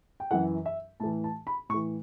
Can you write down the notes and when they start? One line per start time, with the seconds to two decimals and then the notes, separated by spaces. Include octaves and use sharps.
0.20 G5
0.31 F#2 E3 F#5
0.66 E5
1.00 A2 E3 A5
1.24 A5
1.47 B5
1.69 A2 C#6
1.74 E3